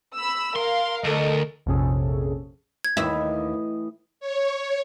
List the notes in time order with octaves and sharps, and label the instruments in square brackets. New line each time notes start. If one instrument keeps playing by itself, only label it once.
[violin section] B5 E6
[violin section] A#4 F5 [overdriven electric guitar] C6
[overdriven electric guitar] D2 [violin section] A4 A#4 D#5
[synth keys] A#1 F2 C3 C#4 G#4 A4
[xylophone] G#6
[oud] D#2 E5 [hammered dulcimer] A2 E3 D#5
[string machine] C#5